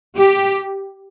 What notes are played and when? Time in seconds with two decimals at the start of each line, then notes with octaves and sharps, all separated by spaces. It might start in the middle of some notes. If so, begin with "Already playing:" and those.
0.16 G4